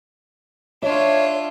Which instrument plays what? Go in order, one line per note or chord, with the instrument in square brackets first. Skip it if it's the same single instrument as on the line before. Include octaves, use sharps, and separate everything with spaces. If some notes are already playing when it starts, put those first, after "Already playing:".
[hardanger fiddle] D4 F4 [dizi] C#5 [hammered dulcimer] E5